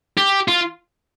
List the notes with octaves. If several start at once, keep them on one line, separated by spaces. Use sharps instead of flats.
G4
F4